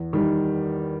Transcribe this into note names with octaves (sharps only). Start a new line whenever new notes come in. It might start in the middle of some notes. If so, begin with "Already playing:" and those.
Already playing: E2
D#3 G3